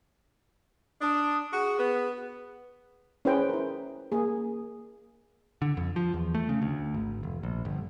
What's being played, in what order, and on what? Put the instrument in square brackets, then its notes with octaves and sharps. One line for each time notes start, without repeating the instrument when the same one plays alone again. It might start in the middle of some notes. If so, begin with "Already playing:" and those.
[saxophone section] D4 [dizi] D#6
[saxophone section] F#4 [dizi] G#4
[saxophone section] B3
[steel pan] C#4 E4 G#4 B4 C5 G5
E4 A#4
A#3 G#4
[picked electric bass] D3
F2
F3
E2
A3
C#3
D2
G#1
F1
A#1
G1